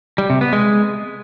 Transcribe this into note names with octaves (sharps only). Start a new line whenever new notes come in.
G3
C3
B3
G#3